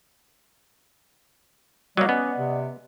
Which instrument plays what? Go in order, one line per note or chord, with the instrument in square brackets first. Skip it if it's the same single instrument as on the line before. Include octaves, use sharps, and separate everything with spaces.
[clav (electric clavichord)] F#3 A#3 [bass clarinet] G3 [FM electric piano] D5 D#5 F#5
[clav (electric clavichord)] B3 [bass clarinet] C#4
[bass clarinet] C3